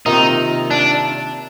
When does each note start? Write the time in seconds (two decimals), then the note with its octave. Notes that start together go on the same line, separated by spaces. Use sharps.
0.06 C3 D#3 A#3 D#4 F4
0.71 D4